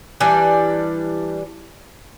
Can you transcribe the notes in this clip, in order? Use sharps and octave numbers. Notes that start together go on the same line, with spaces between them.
E3 G3 D4